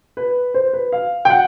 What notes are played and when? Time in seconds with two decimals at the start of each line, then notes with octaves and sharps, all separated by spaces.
0.17 B4
0.54 C5
0.73 B4
0.92 F5
1.25 G5
1.30 F#5